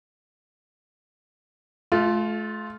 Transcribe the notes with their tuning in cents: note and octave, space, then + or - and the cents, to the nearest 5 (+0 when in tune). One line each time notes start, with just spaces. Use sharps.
A3 -40 F4 +0